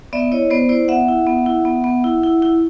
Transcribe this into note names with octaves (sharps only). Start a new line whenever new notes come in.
B3 D5 E5
E4 C#5 D#5
B3 C5 D5
E4 C5 D5
B3 E5 F#5
E4
B3
E4
B3
B3
E4
E4
E4